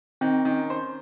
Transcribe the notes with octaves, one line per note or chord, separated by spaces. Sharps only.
D#3 C4
D#3 C#4
C5